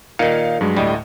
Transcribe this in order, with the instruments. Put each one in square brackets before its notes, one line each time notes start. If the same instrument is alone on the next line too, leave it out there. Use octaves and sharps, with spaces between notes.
[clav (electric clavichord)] A#2 D#3 [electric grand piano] D#4 F5 C#7
[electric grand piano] G2 F#3 G#3
[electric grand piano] D2 A2 D#5 [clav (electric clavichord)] G3